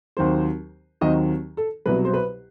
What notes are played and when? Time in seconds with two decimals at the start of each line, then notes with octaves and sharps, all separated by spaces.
0.17 D#2 D#3 F#3 C4 C5
1.01 D#2 D#3 F#3 C4 D#5
1.57 A4
1.86 C2 B2 F#3 B4
2.05 C5
2.14 B4